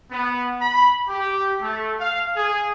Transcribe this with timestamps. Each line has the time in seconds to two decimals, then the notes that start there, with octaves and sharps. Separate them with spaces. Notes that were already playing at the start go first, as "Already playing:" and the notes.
0.11 B3
0.60 B5
1.08 G4
1.61 A3
2.00 F5
2.36 G#4